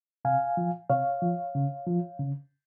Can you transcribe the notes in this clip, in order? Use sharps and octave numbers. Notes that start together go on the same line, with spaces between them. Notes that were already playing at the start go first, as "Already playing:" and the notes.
C3 F5 G#5
F3
C3 C#5 F5
F3
C#3
F3
C#3